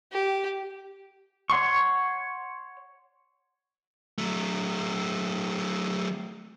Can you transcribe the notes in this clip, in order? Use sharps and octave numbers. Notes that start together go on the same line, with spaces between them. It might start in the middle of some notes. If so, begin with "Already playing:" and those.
G4
C#5 F#5 C6 C#6
F#3 A3